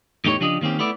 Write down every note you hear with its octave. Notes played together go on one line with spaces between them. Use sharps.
E2 A2 D#4 G4 C#5
C#3 F3 D4 G4 D#5
D#3 A#3 C4 C#4 G4
A3 B3 E4 D5